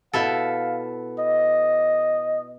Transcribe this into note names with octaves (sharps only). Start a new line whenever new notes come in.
B2 E4 A4 F5
D#5